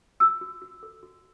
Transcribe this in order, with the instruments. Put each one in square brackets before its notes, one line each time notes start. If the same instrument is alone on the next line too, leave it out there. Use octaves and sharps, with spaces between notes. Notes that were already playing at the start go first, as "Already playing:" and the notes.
[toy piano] F#4 E6
F#4
F#4
A4
F#4